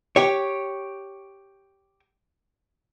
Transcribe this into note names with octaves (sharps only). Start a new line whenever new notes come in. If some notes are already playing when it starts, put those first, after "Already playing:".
G4 C#5